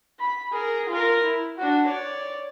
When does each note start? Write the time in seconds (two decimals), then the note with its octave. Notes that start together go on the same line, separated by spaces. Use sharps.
0.20 B5
0.52 G#4 A#4
0.89 F4 A#4
1.24 E4
1.58 D4 F#4
1.87 C#5 D5